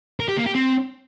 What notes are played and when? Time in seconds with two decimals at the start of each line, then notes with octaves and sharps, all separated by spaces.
0.20 A#4
0.29 G4
0.37 A#3
0.46 G4
0.55 C4